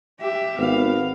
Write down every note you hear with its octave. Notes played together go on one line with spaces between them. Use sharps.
G4 E5
G#1 B3 F5